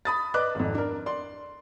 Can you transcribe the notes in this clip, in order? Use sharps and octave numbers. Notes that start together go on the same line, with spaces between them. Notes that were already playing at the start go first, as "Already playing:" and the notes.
B5 D#6 A6
B4 D5 D#5 D6 F#6
G#1 F2
D4 A#4
D5 C6